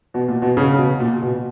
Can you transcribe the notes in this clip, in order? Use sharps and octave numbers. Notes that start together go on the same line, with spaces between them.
B2
A#2
B2
C#3
C#3
B2
A#2
B2